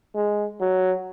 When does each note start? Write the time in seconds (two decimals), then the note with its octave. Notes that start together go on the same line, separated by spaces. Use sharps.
0.15 G#3
0.61 F#3